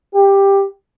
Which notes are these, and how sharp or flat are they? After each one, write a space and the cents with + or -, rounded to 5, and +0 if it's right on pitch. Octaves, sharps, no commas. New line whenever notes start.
G4 +10